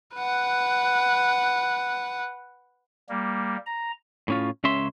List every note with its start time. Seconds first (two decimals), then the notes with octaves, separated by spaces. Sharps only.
0.16 B4 F#5
3.09 G3 A#3
3.66 A#5
4.28 A2 C#4 F4
4.64 C#2 C#3 C#4 E5 C6